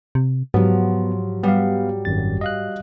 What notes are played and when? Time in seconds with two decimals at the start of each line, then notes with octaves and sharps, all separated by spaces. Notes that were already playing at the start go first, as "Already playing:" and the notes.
0.15 C3
0.54 G#2 F3 F#3 B3 G4
1.43 G3 B3 F5
2.05 G#1 F#2 A6
2.41 D#5 F5 F#6